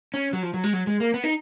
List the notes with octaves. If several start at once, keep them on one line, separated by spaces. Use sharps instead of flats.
C#4
F#3
F3
F#3
G#3
F#3
G#3
A#3
B3
D#4